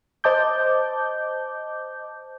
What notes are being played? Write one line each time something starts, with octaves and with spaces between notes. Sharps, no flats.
C5 D#5 A5 D6 G6